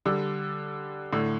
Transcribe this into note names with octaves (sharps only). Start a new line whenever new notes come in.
D3 G3
A2 D3